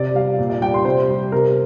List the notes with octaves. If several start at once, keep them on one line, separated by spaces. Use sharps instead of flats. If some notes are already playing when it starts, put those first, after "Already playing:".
Already playing: C3 D5
G3 F5
A#2
D5
G3 G5
C6
C3 C5
G3
C3 A#4